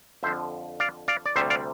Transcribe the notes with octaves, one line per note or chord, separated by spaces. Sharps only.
F2 D3 F3 C5 E5
D5 F5
D5 F5
D5
D2 C3 G3 C5 E5
D5 F5